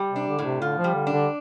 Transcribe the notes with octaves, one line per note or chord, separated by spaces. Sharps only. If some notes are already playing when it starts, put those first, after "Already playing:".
Already playing: G3
C3 D4
D3
A2
C3
D3 F4
F3
G3
D3
D4
D3